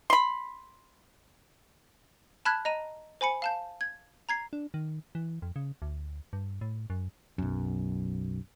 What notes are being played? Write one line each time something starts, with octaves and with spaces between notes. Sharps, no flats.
B5 C6
A5 B5 F6 F#6 G#6 B6
D#5 A#5 D#7
C5 G#5 B5 C#7
F5 A5 G6
G#6
A#5 G#6 C7
D4
D#3
E3
F2
C#3
D2
G2
A2
F#2
B1 F#2